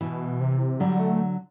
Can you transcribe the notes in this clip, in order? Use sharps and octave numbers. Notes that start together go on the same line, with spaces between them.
B2 E3
C3
D3 F#3 G3
A3